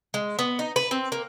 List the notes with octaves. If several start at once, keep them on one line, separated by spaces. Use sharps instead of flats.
G#3
B3
D#4
B4
C4
A#3